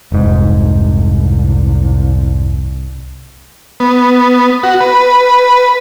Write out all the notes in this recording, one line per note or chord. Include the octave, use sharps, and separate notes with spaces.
F1 C2 G#2
B3
F#4
B4